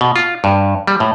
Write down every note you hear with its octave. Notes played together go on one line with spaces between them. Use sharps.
B2
F4
G2
G3
A2